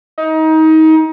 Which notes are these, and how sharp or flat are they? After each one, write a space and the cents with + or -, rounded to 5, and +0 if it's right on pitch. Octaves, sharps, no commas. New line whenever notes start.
D#4 +25